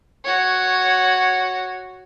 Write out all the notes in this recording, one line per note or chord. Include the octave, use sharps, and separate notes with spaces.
F#4 C#5